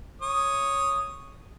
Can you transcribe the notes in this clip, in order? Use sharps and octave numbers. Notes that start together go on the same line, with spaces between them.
C#5 D#6